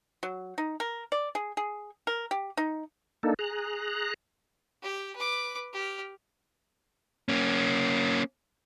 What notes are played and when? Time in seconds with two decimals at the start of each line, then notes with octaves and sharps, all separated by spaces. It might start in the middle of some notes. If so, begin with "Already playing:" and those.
0.23 F#3
0.58 D#4
0.80 A#4
1.12 D5
1.35 G#4
1.57 G#4
2.07 A#4
2.31 G4
2.57 D#4
3.23 A#3 D4 D#4 A4
3.39 G#4 A#5 F#6
4.82 G4
5.16 B4 D6
5.73 G4 F6
7.29 A#3 C#4